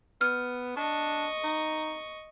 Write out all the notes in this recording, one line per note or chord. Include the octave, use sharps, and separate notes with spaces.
B3 F6
D4 D#5 C#6
D#4